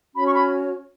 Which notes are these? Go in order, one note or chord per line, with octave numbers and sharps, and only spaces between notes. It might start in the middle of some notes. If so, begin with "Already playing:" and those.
C#4 F#4 C#5 B5
C#6
B5